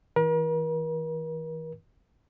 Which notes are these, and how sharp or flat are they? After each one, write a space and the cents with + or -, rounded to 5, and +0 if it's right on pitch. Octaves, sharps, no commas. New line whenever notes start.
E3 -40 A#4 +45